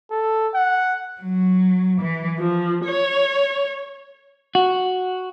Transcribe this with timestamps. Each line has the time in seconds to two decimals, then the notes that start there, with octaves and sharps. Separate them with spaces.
0.11 A4
0.55 F#5
1.20 F#3
2.01 E3
2.39 F3
2.84 C#5
4.55 F#4